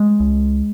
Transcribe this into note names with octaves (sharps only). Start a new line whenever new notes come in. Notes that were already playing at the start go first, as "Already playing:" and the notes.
Already playing: G#3
C#2